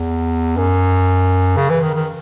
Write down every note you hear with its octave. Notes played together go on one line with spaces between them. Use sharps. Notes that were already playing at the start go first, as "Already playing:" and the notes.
Already playing: E2
F#2
C#3
E3
D#3
D#3